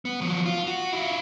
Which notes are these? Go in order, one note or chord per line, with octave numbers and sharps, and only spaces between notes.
B3
F3 F#3
F4
F#4
E4 F4